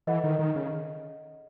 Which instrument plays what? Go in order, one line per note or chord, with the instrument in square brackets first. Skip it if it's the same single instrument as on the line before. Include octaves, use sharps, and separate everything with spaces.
[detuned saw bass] E3 [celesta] A4 D#5 F#5
[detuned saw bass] D#3
D#3
C#3